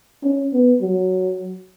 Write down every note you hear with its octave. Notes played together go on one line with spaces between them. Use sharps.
C#4
B3
F#3